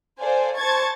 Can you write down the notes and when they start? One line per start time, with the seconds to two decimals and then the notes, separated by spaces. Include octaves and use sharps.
0.19 A4 C5 D5 F5 G#5
0.57 C5 A5 C#6 G#6 A6